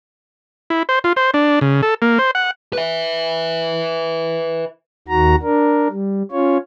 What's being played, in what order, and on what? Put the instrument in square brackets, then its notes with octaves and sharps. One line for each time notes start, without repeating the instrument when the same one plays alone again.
[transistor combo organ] E4
C5
F4
C5
D4
C#3
A4
A#3
C5
F#5
[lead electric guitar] B4 E5
[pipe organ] D#2 D#3 F#4 A#5
D4 A#4
G3
C#4 F4 C#5